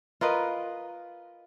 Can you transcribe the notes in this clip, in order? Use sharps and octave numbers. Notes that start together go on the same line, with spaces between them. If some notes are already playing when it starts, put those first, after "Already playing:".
F4 A#4 B4 D#5